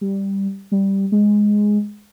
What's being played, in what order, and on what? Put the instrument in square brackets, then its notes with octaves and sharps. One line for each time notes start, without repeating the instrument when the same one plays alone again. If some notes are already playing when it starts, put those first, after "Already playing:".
[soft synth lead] G3
G3
G#3